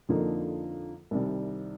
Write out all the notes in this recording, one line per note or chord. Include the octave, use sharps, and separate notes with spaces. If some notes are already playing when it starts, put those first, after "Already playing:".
F2 D3 F3 A#3 D#4
C2 C3 D#3 G3